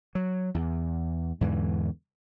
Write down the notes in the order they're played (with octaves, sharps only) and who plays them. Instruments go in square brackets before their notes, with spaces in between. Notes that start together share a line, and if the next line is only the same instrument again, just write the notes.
[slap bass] F#3
E2
E2 G#2 D3 E3